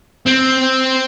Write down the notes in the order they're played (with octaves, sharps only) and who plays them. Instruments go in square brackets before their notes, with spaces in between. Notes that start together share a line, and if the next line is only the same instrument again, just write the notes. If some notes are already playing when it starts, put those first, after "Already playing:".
[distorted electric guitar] C4